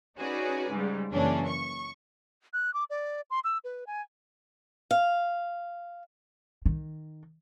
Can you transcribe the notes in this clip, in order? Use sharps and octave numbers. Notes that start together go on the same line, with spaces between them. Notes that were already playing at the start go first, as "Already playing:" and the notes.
C#4 D#4 F#4 G#4 B4 D5
G#2 C#3 G3
F#2 C#3 E3 A#3 C#4 D4
C#6
F#6
D6
D5
C6
E6
B4
G#5
F5
D#3